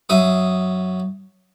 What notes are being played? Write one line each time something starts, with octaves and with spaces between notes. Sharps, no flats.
F#2 E5 F5 D#6